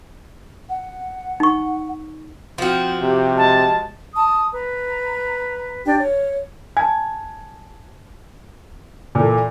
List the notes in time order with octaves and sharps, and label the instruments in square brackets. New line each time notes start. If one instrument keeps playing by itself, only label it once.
[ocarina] F#5
[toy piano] D#4 C#6
[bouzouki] F3 F#4 [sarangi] C4
[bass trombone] C3 [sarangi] G4
[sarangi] G#3 [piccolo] A5
[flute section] A5 [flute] D#6
[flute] B4 [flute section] A#5
[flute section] D4 G4 G5
C#5
[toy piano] G#5 A5 [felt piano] G#6
[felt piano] A#2 E3 A4